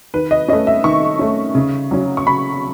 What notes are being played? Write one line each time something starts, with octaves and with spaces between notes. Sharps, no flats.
D#3 B4
D#5
A3 C#4 D#5
E5
D#3 C#6
A3 C#4
C#3
F#3 C#4
C#6
C#3 B5